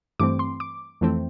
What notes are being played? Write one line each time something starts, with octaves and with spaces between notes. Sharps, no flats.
G2 E3 A3 C4 D6
C6
D6
F2 E3 A3 C4